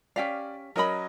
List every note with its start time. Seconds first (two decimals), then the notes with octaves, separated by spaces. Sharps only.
0.16 C#4 G4 D5 F5 B6
0.76 F#3 C#4 A#4 D#5 B5